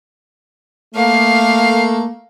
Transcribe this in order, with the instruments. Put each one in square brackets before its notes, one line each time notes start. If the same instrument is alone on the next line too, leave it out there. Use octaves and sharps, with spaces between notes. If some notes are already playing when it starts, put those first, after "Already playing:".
[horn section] A3 A#3 [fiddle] F5